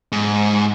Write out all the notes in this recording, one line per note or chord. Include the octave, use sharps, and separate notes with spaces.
G#2